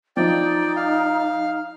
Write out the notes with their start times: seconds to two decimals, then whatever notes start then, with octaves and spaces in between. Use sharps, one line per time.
0.17 F3 D#4 D5 D#5 G5
0.76 F5